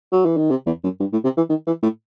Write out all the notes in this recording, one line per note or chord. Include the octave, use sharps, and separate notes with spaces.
F#3
E3
D#3
C3
E2
F#2
G2
A2
C3
E3
D#3
E3
A2